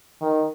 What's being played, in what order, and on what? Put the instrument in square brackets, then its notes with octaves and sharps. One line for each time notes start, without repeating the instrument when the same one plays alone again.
[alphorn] D#3